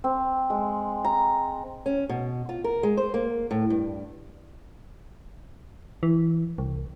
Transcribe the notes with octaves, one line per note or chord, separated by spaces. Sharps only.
C4
G#3
A#5
C#4
B2
F4
A#4
G#3
C5
A#3
A2
G2
E3
C2